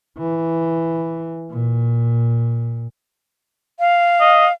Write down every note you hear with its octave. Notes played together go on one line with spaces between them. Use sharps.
E3
A#2
F5
D#5